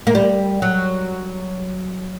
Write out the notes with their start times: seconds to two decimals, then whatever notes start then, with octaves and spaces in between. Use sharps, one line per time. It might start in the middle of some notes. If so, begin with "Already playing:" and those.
0.07 A#3
0.15 G3
0.62 F#3